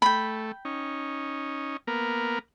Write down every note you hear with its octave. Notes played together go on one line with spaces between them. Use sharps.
A3 G5 B5
C#4 D#4
A#3 B3 A#4